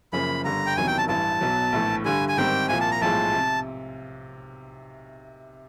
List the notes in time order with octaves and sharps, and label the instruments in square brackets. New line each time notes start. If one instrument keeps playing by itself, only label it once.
[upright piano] F#1 F#2 C#3 F3 A#3 [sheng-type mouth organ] B5
[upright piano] G1 G2 D3 G3 [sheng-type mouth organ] A#5
[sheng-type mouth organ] G5
[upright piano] E1 E2 C3 D#3 F#3 [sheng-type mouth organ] G#5
[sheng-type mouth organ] G5
A5
[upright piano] A1 G2 E3 [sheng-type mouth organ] A5
[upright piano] B1 B2 F#3
A#1 A2 E3 A3
[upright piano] G2 D3 G3 [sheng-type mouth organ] G#5
[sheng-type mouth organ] G#5
[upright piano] G#1 G#2 D#3 G3 C4 [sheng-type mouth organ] G5
[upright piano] C2 A#2 F3 A#3 [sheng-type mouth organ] G#5
[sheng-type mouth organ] A5
A#5
[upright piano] B1 A2 F3 G#3 [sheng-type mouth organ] A5
[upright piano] C3